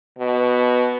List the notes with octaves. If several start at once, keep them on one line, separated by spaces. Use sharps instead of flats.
B2